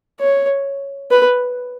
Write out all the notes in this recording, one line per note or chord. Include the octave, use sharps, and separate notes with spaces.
C#5
B4